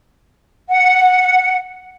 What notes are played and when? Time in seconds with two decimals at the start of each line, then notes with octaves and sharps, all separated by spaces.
0.69 F#5